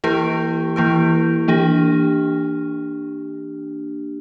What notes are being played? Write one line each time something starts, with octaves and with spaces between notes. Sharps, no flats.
E3 A#3 E4 G4 B4
E3 A#3 E4 G4 B4
E3 A#3 D4 G4